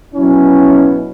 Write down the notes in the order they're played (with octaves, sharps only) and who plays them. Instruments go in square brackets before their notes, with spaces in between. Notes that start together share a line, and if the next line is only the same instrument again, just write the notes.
[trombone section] B2 F#3 C#4 E4